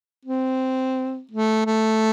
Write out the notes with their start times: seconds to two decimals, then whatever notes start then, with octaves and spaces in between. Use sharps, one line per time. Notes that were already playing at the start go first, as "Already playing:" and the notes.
0.25 C4
1.31 A3
1.66 A3